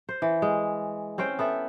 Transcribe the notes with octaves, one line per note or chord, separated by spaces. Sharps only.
C5
E3
G#3
C4 C#4 C5 G5
B3 A4 E5